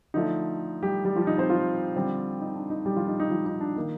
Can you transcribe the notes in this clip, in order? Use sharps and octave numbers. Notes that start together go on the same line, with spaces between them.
D3 F3 A3 D#4
G3 G4
G3 G4
F3 F4
D#4
C4 C5
F3 F4
D3 G3 C4
D#4
D4
D#4
G3 G4
F3 F4
D#4
D#4
F3 F4
D#4
D4
D#3 A#3 D#4